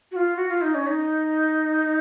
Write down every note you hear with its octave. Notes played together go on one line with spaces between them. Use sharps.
F#4
F4
F#4
F4
D#4
C#4
D#4